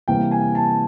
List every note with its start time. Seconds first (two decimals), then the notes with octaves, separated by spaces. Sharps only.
0.08 C3 E3 G3 A#3 G5
0.31 G#5
0.55 A5